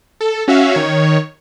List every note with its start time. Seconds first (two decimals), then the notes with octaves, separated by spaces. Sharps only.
0.21 A4
0.48 C#4 F#4 E5 F5
0.75 D#3 C#5